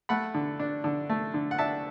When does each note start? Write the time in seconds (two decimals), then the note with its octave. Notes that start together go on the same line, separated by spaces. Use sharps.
0.09 A3 F#5 B5
0.34 D3
0.59 D4
0.84 D3
1.09 A3
1.34 D3
1.51 F#5
1.58 D4 E5 A5